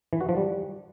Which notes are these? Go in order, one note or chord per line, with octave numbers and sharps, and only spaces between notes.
E3
F#4
F3
G3